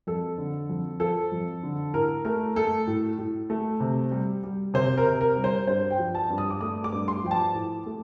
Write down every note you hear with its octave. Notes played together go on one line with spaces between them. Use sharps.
F2 A4
D3
F2
F3 A4
F2
D3
A2 A#4
A3 A#4
A3 A4
A2
A2
A3
C3
G3
G3
C3 C5
A#4
C3
A#4
G3
C5
G2 C5
G5
F3
A5
G2
D#6
D6
A3 D#6
D6
G2
C6
F3 G5
A5
A2
A3